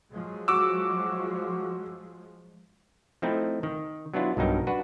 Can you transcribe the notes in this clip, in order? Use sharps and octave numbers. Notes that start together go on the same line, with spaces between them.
F3 F#3 G#3
F#4 D6 E6
F3 A3 C4 D#4 E4
D#3
F#3 B3 D4 E4 F4
B1 G2 F#3 D#4 A#4
D4 F#4 B4